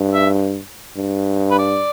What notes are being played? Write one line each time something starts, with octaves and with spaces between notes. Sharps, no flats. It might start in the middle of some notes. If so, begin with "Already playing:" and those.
Already playing: G2
E5
G2
B4
D5